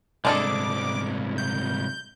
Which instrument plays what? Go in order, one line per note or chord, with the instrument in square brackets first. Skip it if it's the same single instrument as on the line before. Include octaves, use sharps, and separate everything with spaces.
[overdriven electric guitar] C2 G#2 [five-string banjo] G#3 D4 A4 [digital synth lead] D6
[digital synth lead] G6